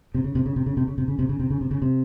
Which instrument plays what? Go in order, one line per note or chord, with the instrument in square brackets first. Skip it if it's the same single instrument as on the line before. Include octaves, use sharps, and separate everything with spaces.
[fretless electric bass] C3
C#3
C3
C#3
C3
C#3
C3
C#3
C3
C#3
C3
C#3
C3
C#3
C3
C#3
C3